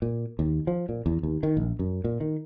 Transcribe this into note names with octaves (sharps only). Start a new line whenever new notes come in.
A#2
D#2
F3
A#2
E2
D#2
D#3
A#1
F#2
A#2
D#3